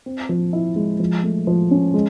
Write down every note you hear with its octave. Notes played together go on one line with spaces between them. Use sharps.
C4
F3
E4
G#3
F3
A3
F3
C#4
G#3